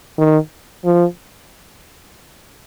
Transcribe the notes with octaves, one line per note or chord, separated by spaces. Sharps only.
D#3
F3